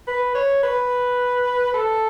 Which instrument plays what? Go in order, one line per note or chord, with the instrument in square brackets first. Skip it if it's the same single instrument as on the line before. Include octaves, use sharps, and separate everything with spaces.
[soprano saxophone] B4
C#5
B4
A4